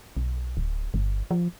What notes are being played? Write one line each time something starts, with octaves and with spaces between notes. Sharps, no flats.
B1
D1
G1
F3